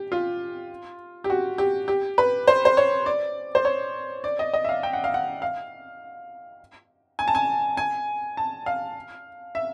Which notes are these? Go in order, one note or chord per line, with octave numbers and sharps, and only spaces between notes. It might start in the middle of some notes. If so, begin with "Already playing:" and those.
Already playing: G4
F4
G4
F#4
G4
G4
B4
C5
C5
C#5
D5
C5
C#5
D5
D#5
D#5
E5
F5
G5
F#5
F5
F#5
F5
G#5
A5
G#5
G#5
A5
F5
E5